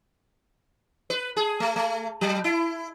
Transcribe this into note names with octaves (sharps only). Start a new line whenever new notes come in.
B4
G#4
A3
A3
F#3
E4